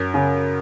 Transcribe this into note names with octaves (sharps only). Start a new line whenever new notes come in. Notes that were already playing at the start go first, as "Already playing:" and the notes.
Already playing: F#2
C#3